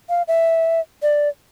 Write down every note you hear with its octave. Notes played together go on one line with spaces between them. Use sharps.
F5
E5
D5